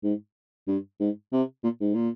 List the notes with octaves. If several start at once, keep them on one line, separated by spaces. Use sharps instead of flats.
G#2
G2
G#2
C3
A#2
G#2
A#2